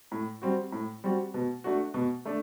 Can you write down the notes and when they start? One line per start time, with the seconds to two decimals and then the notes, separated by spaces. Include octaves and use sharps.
0.12 A2
0.42 G3 C4 F#4
0.72 A2
1.04 G3 C4 F#4
1.34 B2
1.64 A3 D4 F#4
1.94 B2
2.25 A3 D4